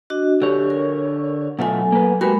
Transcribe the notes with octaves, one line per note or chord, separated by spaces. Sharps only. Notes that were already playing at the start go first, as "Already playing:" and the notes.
D4 F#4 D#5
D3 G4 C#5
A#4
B2 F#3 A3 F4 A4 G#5
A#3 B4
G#3 F#4 G4 A#4 B4 B5